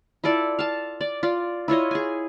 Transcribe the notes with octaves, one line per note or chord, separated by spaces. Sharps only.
E4 F4 A4 D5
F5 A5
D5
F4 D5
E4 F4 C#5 D#5
G#4 G#5